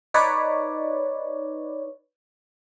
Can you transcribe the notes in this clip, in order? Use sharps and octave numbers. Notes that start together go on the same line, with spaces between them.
D#4 B4 C#5 D5